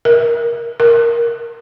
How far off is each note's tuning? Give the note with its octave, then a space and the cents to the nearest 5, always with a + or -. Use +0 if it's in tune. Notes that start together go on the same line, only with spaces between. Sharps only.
A#4 +20
A#4 +5